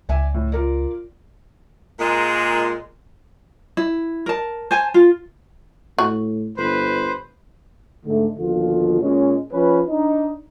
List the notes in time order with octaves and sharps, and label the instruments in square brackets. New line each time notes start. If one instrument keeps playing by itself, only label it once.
[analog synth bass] C#2 [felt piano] D5 E5 G#5
[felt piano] A2
F4 A#4 D5
[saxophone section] A#2 G#3
[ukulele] E4
A#4 A5
C5 G#5 A5
F4
[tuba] A2 [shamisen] F#4
[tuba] G1 [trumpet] B4 [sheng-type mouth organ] C5
[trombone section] G#2 D3 A3
D#2 B2 D3 F3 F4
A#2 G#3 C#4
F3 C#4 B4
D4 D#4